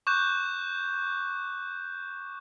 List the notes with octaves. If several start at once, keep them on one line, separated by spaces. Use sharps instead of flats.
C#6 D6 F#6 G6 E7